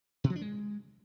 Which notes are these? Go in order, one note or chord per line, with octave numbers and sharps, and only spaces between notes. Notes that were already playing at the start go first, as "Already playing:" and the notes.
B2
F3
D4
G#3